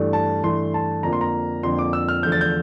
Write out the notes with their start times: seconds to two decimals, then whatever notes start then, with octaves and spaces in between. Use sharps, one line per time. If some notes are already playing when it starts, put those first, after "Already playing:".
Already playing: G2 E3 A3
0.13 A5
0.43 G2 E3 A3 C6
0.74 A5
1.03 F2 D3 F3 A#3 A#5
1.13 C6
1.21 A#5
1.63 F2 D3 F3 A#3 C6
1.79 D6
1.93 E6
2.09 F6
2.23 E2 D3 F3 A3 G6
2.32 A6
2.41 G6